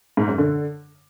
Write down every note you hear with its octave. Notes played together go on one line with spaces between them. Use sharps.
G#2
F#2
D3